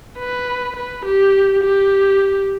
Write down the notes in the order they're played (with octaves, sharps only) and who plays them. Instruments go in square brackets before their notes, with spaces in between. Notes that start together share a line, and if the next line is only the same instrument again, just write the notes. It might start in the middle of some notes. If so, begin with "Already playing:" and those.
[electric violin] B4
B4
G4
G4